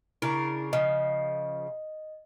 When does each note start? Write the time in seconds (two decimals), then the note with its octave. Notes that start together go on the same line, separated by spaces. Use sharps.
0.22 C#3 D4 E4 A#4
0.73 C#3 F3 D#5